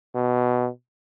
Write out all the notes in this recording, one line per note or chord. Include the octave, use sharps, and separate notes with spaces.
B2